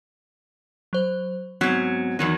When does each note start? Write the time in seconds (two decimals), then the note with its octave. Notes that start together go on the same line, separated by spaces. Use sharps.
0.93 F#3 C5
1.61 G#2 F#3 B3 C4 G#6
2.19 E2 D#3 F#3 D#4